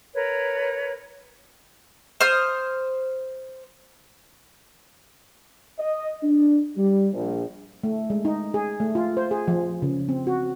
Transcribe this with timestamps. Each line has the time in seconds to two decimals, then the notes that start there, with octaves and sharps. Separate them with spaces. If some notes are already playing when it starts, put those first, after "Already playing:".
0.14 A#4 B4 C#5
2.21 C5 D#6 F6
5.79 D#5
6.23 D4
6.76 G3
7.13 A#1
7.84 A3
8.10 G#3
8.25 D#4
8.54 G#4
8.80 A3
8.95 F4
9.17 C5
9.31 G#4
9.48 F3
9.82 C#3
10.09 C4
10.27 F#4